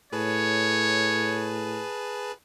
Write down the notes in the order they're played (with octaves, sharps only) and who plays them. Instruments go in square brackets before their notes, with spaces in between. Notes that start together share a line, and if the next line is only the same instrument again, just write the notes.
[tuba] A2 [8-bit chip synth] G#4 B4 A5 [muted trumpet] C#5